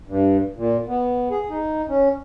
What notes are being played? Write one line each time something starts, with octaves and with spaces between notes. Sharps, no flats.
G2
A#2
B3
G#4
D#4
C#4